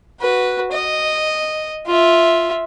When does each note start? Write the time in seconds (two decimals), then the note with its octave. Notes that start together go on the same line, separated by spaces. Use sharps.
0.21 F#4 B4
0.72 D#5
1.86 F4 E5